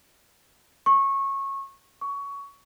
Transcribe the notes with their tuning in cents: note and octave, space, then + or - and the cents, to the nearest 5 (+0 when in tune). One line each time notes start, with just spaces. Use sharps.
C#6 -20
C#6 +20